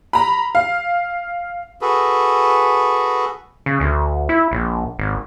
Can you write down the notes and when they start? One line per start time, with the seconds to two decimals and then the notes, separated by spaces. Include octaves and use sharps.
0.13 A#5 B5
0.55 F5
1.81 F#4 G#4 A4 B4
3.66 C#3
3.80 D2
4.29 E4
4.51 A#1
4.99 G#1